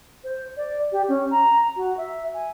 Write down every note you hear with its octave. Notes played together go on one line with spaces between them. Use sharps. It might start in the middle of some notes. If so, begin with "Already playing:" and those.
C5
D5
G4
C#4
A#5
F#4
E5
G#5